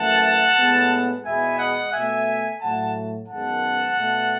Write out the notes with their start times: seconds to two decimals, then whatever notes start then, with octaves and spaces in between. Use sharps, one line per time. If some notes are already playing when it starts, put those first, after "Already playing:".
Already playing: F#2 E3 A3 F#5 A5
0.57 A2 G#3 B3
1.25 E2 B2 G#3 B3 E5 G#5
1.59 D#5 F#5
1.92 B2 A3 E5 G#5
2.61 A2 F#3 A3 F#5 A5
3.29 F#2 D#3 G#3 B3 F#5 A5
3.97 B2 A3